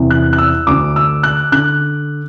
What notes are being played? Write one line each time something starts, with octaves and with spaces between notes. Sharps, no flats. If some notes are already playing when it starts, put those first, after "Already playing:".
Already playing: E2 C3 E3
F#6
F#6
E6
D2 D3 D6
E6
F#6
D3 F#6